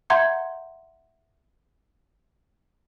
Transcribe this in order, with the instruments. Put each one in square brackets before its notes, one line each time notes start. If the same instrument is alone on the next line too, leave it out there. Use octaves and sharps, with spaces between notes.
[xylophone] E5 F#5 A#5 C6 G6 G#6